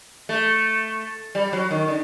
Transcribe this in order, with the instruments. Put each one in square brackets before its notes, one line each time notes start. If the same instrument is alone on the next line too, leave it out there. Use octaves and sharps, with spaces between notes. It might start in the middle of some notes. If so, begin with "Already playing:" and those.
[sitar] A3
G3
F#3
D#3
D3